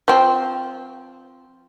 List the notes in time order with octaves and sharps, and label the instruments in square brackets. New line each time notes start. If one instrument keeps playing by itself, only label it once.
[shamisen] F3 C4